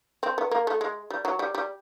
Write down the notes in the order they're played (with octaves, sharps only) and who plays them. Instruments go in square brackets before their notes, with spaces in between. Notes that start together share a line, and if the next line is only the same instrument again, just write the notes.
[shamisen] C4
B3
A#3
A3
G#3
G3
F#3
G3
G3